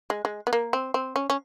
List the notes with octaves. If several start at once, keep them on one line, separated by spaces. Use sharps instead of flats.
G#3
G#3
B3
A#3
C4
C4
C#4
C#4